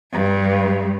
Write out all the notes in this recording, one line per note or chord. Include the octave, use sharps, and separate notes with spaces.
G2